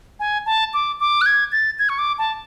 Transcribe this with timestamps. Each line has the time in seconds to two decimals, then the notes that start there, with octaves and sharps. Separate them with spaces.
0.20 G#5
0.46 A5
0.74 D6
1.00 D6
1.21 F#6
1.26 G#6
1.52 A6
1.79 G#6
1.89 C#6
1.99 D6
2.18 A5